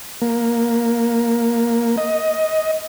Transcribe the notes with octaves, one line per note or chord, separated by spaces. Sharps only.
A#3
D#5